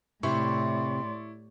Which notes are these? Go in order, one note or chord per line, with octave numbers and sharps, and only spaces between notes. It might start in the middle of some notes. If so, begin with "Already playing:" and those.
A2 C3 E4 D5 C6 C#6